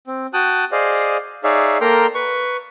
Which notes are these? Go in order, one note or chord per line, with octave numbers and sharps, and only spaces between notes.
C4
F#4 G5 A5 D#6 F#6
G#4 C5 D5 D#5 F5
D#4 G#4 C#5 D5 E5 F5
A#3 A4 A#4 G5 A#5 C6
B4 C#6